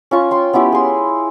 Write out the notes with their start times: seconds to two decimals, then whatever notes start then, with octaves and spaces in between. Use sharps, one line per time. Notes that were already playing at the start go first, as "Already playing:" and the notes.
0.11 C#4 F4 C#6
0.31 G5 C6
0.53 B3 C#4 E4 G4
0.72 G#4 C6